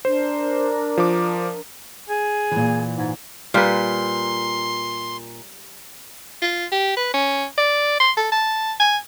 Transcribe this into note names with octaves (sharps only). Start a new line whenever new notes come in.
D4 A#4 C5
F3 D6
G#4
A#2 E3
G#2
A#2 G3 B4 C6
F4
G4
B4
C#4
D5
C6
A4
A5
G#5